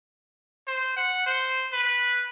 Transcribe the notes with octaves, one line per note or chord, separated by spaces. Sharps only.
C5
F#5
C5
B4